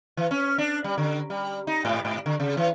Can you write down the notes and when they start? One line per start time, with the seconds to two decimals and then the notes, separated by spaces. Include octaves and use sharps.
0.17 E3
0.31 C#4
0.58 D4
0.84 G3
0.98 D3
1.30 G3
1.67 D#4
1.85 G#2
2.05 G#2
2.26 D3
2.40 C#3
2.57 E3